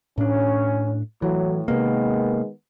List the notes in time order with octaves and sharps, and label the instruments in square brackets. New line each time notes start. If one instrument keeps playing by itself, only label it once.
[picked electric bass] A2 D4 [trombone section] C#4
[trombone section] A2 [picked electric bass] E3 [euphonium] F#3
[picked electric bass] C3 A#3 [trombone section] D#3 B3 [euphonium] G#3